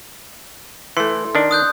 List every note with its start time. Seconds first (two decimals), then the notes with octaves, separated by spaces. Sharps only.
0.97 E3 A3 C6
1.35 D#3 D4
1.51 D#6 F#6 G6